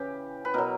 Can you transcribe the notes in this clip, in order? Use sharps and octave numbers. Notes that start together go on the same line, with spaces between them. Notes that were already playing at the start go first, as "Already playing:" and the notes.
Already playing: C#3 E3 G4
B4
B2 F#3 A#4